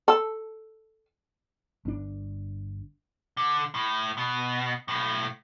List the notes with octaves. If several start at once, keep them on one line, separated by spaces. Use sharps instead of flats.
A4
G1 D4
D3
A2
B2
B1 A2